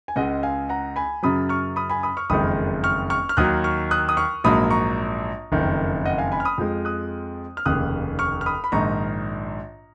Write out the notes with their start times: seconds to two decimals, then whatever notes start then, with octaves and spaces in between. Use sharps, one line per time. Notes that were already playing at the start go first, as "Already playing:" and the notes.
0.08 G#5
0.16 C#2 C#3 G#3 D#5 F#5
0.43 F5 G#5
0.69 F#5 A#5
0.96 G#5 B5
1.23 F#2 C#3 F#3 B5 D#6
1.49 C#6 F6
1.76 B5 D#6
1.90 G#5 B5
2.03 B5 D#6
2.17 C#6 F6
2.30 F#1 F2 D#3 G#3 B5 D#6
2.84 C#6 F6
3.10 C#6 F6
3.29 F6
3.37 D#2 D#3 F#3 D#6 F#6
3.64 C#6 F6
3.91 D#6 F#6
4.09 D#6
4.17 C#6 F6
4.44 A#1 G#2 F#3 A#3 B5 D#6
4.70 A#5 C#6
5.52 F#1 F2 D#3
6.05 D#5 F#5
6.18 F5 G#5
6.32 G#5 B5
6.40 F6
6.45 B5 D#6
6.58 F2 F3 G#3
6.85 D#6 F#6
7.57 F6
7.66 F1 D#2 C#3 D#6 F#6
8.19 C#6 F6
8.41 F6
8.46 B5 D#6
8.64 B5
8.72 A#1 G#2 D#3 A#5 C#6